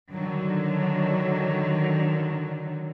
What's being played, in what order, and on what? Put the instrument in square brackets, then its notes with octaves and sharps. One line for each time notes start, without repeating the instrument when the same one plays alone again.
[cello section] D3 D#3 F#3